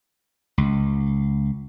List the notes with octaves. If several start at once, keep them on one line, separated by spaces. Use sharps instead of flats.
C#2